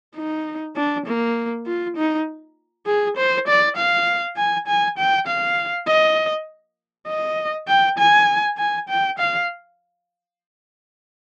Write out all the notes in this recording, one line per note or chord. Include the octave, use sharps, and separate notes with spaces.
D#4
D4
A#3
F4
D#4
G#4
C5
D5
F5
G#5
G#5
G5
F5
D#5
D#5
G5
G#5
G#5
G5
F5